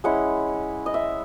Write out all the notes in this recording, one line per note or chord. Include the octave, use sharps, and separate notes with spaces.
G#3 C#4 E4 F#5
D#5
E5